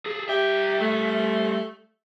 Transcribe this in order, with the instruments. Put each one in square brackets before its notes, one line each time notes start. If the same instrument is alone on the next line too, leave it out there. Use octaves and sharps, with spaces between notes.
[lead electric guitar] G#4 A4
[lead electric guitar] G3 E5 [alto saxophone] G4
[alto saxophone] A3